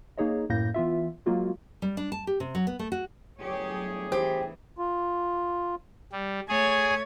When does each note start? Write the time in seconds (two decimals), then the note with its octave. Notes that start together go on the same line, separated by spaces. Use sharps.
0.18 A#3 D#4 G#4 C#5 D#5
0.50 F#2 A2 A#3 G6 A#6
0.74 E3 B3 F4 E5
1.26 F#3 G#3 A#3 F4 F#4
1.82 G3
1.97 D4
2.12 A5
2.27 G4
2.40 C3
2.55 F#3
2.67 B3
2.79 A3
2.92 F#4
3.39 G1 A2 F#3 G4 G#4 C#5
4.12 E3 G4 C5
4.78 F4
6.12 G3
6.49 A3 G#4 C#5 G#5